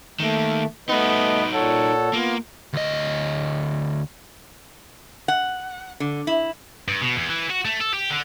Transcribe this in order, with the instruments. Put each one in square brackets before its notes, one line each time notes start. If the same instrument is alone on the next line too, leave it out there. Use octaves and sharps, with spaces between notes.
[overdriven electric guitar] D#3 A#3 [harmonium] A3
[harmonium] A3 B4 D#5 [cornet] B3 [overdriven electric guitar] D#4 F#4
[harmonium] A#2 C#5 F#5 [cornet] A4
[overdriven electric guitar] A#3 [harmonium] B3 F4
[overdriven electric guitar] D2 D#5
[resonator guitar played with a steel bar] F#5
D3
E4
[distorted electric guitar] G2
B2
E2
E3
F#4
A3
A4
G4
D3